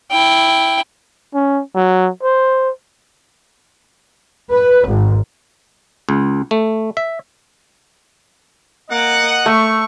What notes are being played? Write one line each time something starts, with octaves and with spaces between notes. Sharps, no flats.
E4 G5
C#4
F#3
C5
B4
G#1
C#2
A3
E5
A#3 D#5 F#5 D6
A3 C#6